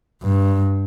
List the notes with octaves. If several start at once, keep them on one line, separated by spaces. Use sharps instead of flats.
G2